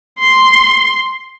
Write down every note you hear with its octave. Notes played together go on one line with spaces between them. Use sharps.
C6